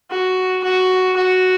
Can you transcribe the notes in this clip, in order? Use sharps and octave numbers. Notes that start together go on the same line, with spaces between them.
F#4
F#4
F#4